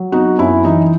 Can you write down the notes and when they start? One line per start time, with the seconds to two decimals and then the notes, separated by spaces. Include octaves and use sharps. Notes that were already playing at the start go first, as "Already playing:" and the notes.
Already playing: F#3
0.12 B3 D#4 F#4
0.38 F#2 C#4 E4
0.64 E3 D#4